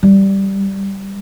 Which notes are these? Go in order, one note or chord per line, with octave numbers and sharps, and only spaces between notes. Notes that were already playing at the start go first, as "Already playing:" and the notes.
G3